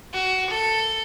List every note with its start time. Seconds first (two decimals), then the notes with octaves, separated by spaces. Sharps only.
0.13 F#4
0.50 A4